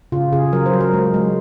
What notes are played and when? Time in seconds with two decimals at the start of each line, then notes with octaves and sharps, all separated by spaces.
0.12 C#3 F4
0.33 C#3 G#4
0.52 F#3 A#4
0.66 C5
0.73 F#3
0.80 A#4
0.94 G#3
1.14 G#3